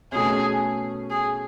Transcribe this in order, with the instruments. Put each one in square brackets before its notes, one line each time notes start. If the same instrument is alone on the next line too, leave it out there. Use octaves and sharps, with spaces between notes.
[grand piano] B2 A3 C#4 [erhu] G#4
[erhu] G#4